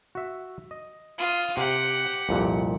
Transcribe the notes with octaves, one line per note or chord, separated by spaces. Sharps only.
F#4 E5
D#5
F4 D#6
C3 G4 F#5
C2 F2 A#2